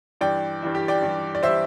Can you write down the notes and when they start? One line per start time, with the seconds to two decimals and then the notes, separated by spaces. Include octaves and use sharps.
0.21 G2 E3 G3 D5 G5
0.62 G2 E3 G3
0.75 G4
0.88 D5 G5
1.02 G2 E3 G3
1.35 D5
1.43 E3 G3 C5 E5